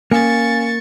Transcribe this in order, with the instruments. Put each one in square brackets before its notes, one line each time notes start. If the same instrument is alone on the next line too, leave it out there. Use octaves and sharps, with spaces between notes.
[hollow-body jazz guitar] A#3 [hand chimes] C#4 F5 G#5 [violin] C#6 A6